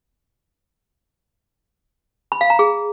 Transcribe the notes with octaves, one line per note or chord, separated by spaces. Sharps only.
B5
F5
A#5
G#4